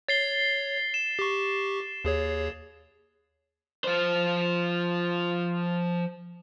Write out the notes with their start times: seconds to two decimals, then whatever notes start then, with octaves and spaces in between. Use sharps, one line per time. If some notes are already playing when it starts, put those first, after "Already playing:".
0.09 C#5 A6 C7 G7
0.94 E7
1.19 G4 C#6
2.05 D#2 G#4 C#5
3.84 F3 C5